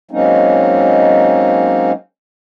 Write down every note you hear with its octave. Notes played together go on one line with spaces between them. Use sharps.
F#3 G#3 A#3 C4 C#4 D#4